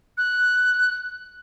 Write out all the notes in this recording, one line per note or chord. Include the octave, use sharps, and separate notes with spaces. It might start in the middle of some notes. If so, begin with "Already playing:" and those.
F#6